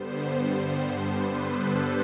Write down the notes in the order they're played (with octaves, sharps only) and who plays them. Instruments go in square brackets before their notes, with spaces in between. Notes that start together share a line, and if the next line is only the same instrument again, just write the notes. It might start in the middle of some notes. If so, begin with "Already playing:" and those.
Already playing: [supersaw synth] G2 D3 G3 B3 C5
C5
B4
A4